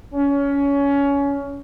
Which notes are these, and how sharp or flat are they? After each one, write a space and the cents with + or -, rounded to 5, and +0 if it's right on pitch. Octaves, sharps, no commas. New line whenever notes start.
C#4 +20